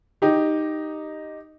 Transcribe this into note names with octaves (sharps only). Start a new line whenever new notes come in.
D#4 G4